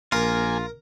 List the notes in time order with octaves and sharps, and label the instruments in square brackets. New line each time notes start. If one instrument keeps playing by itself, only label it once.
[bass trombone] A#1 [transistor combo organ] A#3 G#5 [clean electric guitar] F4 [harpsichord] A#4 A#5